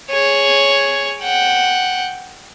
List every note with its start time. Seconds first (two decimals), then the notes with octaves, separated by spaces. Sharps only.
0.10 G#4 C#5
1.22 F#5 G5